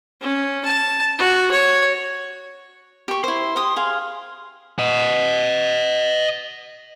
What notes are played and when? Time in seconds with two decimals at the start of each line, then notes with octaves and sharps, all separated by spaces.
0.21 C#4
0.65 A5
1.18 F#4
1.51 C#5
3.08 G4 C#6
3.24 E4 C5 C6
3.56 G4 D#6
3.76 G#4 F5
4.79 D#5 F#5